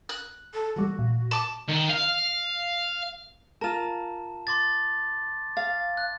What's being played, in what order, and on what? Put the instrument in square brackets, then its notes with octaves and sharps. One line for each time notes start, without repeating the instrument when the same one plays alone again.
[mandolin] F#6
[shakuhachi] A4
[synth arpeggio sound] E3 G3 A3 [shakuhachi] F#4
[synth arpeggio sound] A#2
[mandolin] A5 D6
[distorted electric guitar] D#3
F5
[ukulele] F4 A#4 [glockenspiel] A5 E7
[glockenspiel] C6 D6 A6
[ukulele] F5 [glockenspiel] A6
[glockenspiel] F#6